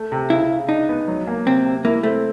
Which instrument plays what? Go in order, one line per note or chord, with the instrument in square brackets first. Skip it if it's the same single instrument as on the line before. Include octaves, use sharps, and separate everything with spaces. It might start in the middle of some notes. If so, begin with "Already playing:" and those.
Already playing: [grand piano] A3
C3
[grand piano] C#3 [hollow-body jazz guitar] E4
[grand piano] C#3
[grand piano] D4 [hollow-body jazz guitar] D#4
[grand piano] B3
F#3
A#3
[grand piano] C3 [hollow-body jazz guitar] C4
[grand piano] C3
[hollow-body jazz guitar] A#3 [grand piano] E4
[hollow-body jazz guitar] A3 [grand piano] C4